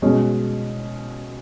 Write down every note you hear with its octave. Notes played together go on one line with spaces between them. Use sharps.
B2 G#3 C#4